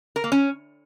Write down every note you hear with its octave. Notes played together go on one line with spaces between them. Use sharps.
A#4
A#3
C#4